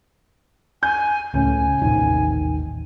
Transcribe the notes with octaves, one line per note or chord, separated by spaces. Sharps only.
G#5 G6
C#2 A2 C#4 G#5
D#1 A1 C3 D#3